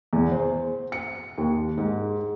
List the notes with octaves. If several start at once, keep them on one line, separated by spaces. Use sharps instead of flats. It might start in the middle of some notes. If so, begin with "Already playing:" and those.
E2
C5
C#7
D#2
G#2